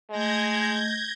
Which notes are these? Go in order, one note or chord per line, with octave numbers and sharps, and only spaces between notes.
G#3 A3 D#5 G6 G#6 A#6